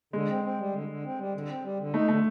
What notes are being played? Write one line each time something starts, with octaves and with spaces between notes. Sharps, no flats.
D3 G#3
C4
C4
G3
D3
D3
C4
G3
D3
C4
G3
D3
A3 D#4
D3 A3